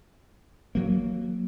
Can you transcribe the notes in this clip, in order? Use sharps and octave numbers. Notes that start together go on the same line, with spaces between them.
F#3 A#3